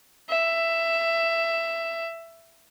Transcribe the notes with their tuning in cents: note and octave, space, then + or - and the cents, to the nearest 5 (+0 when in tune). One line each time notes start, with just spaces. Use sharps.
E5 +10